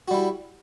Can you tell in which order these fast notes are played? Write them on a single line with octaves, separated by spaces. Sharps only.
F#4 G3 E4